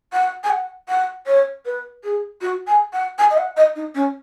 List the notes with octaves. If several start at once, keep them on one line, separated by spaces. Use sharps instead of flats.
F#5
G#5
F#5
F#5
C#5
B4
G#4
F#4
G#5
F#5
G#5
D#5
F#5
D#5
D#4
C#4